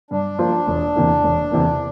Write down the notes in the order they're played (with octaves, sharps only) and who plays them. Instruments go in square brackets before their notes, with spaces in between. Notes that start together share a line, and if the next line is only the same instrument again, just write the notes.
[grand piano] G2 [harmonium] D4
[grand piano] F3 A#3 F4 C5
E1
E2 C3 E3 A#3
E1
E2 C3 E3 A#3